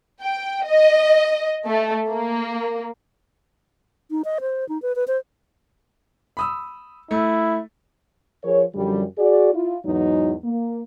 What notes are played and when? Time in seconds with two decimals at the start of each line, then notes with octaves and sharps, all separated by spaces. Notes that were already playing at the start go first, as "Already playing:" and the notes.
0.22 G5
0.66 D#5
1.65 A3
2.11 A#3
4.11 D#4
4.25 D#5
4.41 C5
4.69 D#4
4.82 B4
4.96 B4
5.08 C5
6.37 B5 D#6 E6
7.11 A3 E4
8.44 F3 G#4 A#4 C#5
8.75 F#2 D3 F3 G3
9.18 F#4 G#4 D5
9.54 E4 F4
9.85 E2 G#2 E3 F#3 D#4
10.44 A#3